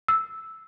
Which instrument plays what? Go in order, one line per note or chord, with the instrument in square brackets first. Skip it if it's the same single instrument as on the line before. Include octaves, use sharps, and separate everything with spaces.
[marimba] E6